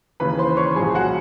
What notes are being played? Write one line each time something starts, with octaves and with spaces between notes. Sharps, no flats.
D#2 C#3 E3 B4 B5
C5 C6
C#5 C#6
C2 A#2 F3 G#4 G#5
F#4 F#5